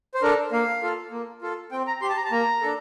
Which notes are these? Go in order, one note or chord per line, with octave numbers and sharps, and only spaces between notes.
C5
D4 A4 A#4
A#3 F5
F4 A4
A#3
F4 A4
C4 G5
A#5
G4 C6
A5
A#5
A5
A#3 A#5
D4 A4